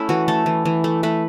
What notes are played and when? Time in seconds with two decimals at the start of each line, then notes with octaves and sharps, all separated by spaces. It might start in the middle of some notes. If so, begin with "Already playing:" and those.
Already playing: A3 C#4 E4
0.09 E3 F#4
0.28 A3 A4
0.46 E3
0.65 E3
0.84 A3
1.03 A3 B4